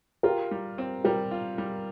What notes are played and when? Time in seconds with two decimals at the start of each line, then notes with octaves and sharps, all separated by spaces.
0.23 F4 G4 A#4
0.51 G3
0.78 C4
1.04 G3 G4 A#4
1.31 F4
1.58 G3